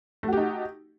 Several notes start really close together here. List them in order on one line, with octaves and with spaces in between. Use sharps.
A3 F#4 G4 D#4